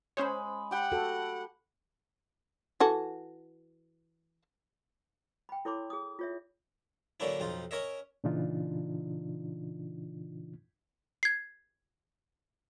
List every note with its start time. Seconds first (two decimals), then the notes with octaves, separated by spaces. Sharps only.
0.17 G#3 C#4 C5 C#5 B5
0.71 G4 F#5 G5 B5
0.92 F#4 A4
2.80 E3 F#4 A4
5.49 G5 B5
5.65 E4 A4 C#5 B5 C6 D6
5.90 G#4 D#6
6.19 F4 C#5 E5
7.20 D3 F#3 A#3 C#4 D4 E4
7.40 B1 F2 D#4 F4
7.71 C#4 A#4 C#5 D#5 E5
8.24 A#2 C#3 E3 D4 D#4 F4
11.23 G#6 C7